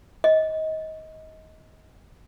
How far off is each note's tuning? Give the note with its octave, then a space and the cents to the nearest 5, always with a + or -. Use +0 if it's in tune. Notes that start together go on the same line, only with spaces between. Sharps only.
D#5 +25